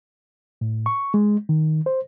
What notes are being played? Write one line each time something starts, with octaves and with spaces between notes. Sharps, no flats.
A2
C#6
G#3
D#3
C5